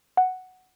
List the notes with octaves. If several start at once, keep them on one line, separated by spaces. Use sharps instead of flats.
F#5